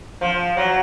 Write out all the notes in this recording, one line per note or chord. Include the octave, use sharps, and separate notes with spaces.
F3
F#3